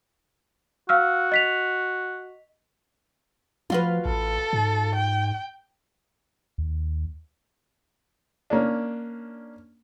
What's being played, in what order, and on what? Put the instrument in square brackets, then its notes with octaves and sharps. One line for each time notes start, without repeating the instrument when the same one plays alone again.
[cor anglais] F#4 [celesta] F5 E6 F6
[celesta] D#5 B6 F7
[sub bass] F3 [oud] F4 F#4 B4
[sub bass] A1 [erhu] A4
[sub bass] G#2
[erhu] G5
[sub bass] D#2
[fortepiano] A#3 C#4 D4